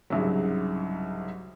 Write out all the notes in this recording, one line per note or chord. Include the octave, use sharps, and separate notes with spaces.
C2 G#2 C#3 F#3